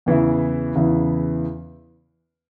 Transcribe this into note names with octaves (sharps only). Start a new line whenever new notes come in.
E2 C#3 E3 B3 E4
E2 C#3 E3 B3 E4